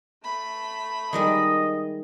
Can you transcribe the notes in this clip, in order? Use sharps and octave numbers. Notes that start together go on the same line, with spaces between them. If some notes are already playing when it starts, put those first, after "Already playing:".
A3 B5
D#3 G3 G#3 D#5